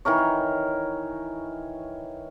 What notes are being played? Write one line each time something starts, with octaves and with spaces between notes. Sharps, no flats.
D#3 E3 A#4 C#5